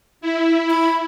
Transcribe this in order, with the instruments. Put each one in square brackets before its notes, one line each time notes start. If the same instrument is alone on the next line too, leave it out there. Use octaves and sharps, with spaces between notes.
[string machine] E4
[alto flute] B5